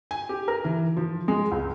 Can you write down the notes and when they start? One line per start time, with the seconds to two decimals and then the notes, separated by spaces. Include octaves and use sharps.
0.11 G#5
0.29 G4
0.48 A#4
0.64 E3
0.97 F3
1.28 G#3
1.51 C#2